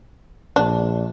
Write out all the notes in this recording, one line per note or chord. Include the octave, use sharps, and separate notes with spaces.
A#1 D4